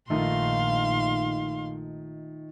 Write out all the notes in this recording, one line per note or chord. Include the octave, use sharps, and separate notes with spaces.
A#1 D#3 A3 D#4 F4 F5 C6